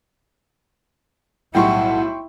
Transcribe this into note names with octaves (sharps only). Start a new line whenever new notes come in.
B1 A2 G3 E4 F#5 G5 C6 C#6